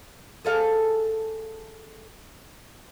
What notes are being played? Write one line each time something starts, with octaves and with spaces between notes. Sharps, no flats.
G#4 A4 F5